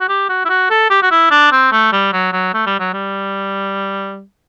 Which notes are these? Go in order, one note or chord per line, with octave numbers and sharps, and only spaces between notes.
F#4
G4
F#4
E4
F#4
A4
G4
F#4
E4
D4
C4
A3
G3
F#3
F#3
A3
G3
F#3
G3